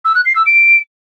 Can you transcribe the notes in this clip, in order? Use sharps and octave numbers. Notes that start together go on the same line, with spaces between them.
E6
F#6
C7
E6
D7